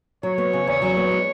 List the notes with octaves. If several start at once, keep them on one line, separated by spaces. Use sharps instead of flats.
F#3 C#5
B3
C#3
E2 C#5
F#3
B3
G#3